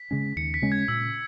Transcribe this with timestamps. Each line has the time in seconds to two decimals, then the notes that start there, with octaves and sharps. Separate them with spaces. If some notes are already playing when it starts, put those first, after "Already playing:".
Already playing: B6
0.11 C#3 G#3 C#4
0.36 D#2 C#7
0.54 B6
0.62 C#3 G#3 C#4
0.72 G#6
0.88 A#2 E6